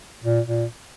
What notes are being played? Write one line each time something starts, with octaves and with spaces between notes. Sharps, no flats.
A#2
A#2